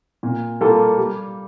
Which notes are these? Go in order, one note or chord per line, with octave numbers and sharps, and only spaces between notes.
A#2
G3 A#3 F4 A4
G3